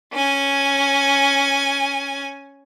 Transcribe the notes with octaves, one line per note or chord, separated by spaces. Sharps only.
C#4 G#5